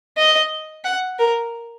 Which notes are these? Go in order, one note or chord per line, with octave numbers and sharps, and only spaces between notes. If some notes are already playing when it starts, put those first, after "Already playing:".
D#5
F#5
A#4